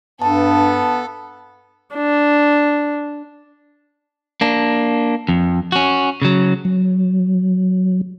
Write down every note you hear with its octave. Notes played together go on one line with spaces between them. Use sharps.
G2 B3 A4 A5
D4
A#3 D4
F2
C#4 F#4
C#3 F#3
F#3